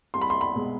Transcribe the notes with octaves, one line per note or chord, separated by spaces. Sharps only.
C2 C6
B5
C6
B5
B2 G#3